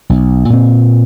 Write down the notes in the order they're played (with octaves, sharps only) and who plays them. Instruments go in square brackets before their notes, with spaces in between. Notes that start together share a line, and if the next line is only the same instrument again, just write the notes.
[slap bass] B1
A#2 C4